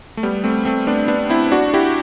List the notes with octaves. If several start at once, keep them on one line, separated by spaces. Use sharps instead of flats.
A3
G3 B3
A3 C4
A3 C4
B3 D4
B3 D4
C4 E4
D4 F#4
E4 G4